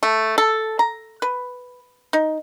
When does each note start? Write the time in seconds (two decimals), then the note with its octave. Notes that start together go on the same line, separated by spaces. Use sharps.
0.03 A3
0.38 A4
0.79 A#5
1.22 B4
2.13 D#4